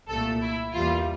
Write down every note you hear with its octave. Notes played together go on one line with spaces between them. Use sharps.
C2 A#2 A3 A4
E4
E2 E3 G3 A#3 F4